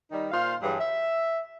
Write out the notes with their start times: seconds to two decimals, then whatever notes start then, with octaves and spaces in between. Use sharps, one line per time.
0.11 D#3 G3 D#4
0.32 A#2 F4 C5 F5
0.62 G2 E3 F#3 G3 G#4
0.79 E5